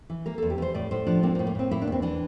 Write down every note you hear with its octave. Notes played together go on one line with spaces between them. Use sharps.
E3
A#3 A#4
E2 A4
G4
E2 C5
A2 D5
A2 C5
F3 D4
A#3 C4
A#3
A2
A#3
A2 C4
A#3 E4
D4
E2 C4
E3 D4